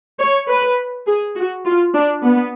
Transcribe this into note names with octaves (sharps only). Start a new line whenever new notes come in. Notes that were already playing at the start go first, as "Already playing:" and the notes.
C#5
B4
G#4
F#4
F4
D4
B3